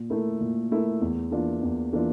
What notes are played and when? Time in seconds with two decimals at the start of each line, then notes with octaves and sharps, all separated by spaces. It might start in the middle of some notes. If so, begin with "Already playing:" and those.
Already playing: A#2
0.10 A3 E4 A#4
0.41 A#2
0.71 A3 E4 A#4
1.01 E2
1.32 E3 A#3 D4 F4
1.63 E2
1.93 E3 A#3 D4 F4